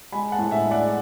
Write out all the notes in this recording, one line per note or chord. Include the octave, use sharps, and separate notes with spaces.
G#3 G#5 B5
F#5 A5
A2
E5 G#5
G#3
D5 F#5